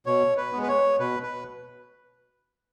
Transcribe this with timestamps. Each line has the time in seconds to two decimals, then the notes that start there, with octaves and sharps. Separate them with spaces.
0.06 B2 C#5
0.37 B4
0.53 G#3 B3
0.63 B4
0.68 C#5
0.99 B2 B4
1.23 B4